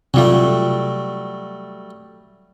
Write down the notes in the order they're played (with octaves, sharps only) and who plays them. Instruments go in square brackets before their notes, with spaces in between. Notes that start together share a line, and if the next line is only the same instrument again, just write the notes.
[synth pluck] C3 F4 [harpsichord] F#3 G3 A3